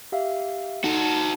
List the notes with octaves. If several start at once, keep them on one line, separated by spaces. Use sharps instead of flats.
G4 E5 F5
D#4 F#4 A4